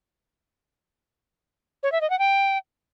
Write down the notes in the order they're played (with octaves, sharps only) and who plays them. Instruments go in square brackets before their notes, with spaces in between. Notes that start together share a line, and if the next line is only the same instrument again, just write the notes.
[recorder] C#5
E5
D#5
F#5
G5